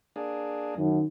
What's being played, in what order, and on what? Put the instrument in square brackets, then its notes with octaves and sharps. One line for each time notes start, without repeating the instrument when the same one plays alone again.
[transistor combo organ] A#3 D4 G#4
[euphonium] F#2 [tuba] D#3